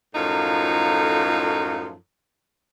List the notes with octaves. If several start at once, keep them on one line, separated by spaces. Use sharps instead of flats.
F#2 A2 F3 D#4 F4 A4